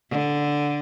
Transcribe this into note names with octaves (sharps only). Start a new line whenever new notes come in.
D3